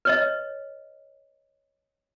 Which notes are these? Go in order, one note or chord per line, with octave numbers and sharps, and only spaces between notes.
B4 C#5 D#5